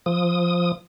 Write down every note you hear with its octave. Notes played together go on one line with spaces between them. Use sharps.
F3 D#6